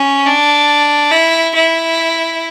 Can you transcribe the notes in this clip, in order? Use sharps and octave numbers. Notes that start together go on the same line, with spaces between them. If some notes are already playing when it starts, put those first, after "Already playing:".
Already playing: C#4
D4
E4
E4